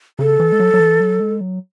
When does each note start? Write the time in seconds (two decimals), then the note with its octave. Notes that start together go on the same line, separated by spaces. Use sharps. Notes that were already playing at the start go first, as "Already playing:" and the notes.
0.19 C#3 A4
0.40 E3
0.52 G#3
0.60 F#3
0.74 F#3
0.80 E3
1.00 F#3
1.20 G#3
1.41 F#3